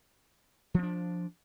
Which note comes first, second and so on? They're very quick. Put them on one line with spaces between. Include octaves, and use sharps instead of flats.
F3 C4 D4